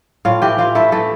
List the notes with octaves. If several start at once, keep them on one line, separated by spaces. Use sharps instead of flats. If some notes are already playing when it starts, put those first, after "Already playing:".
A2 F4 F5
E3 G4 G5
E3 F4 F5
A3 E4 E5
E3 A3 A4